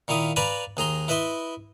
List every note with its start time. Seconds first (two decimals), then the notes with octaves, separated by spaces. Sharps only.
0.08 A#2 D#3 E4 F5 D#6
0.36 B4 D5 F5 G#5 A#5 B5
0.77 D#2 G#4 A#5 C6
1.08 E4 B4 D#5 E5 C6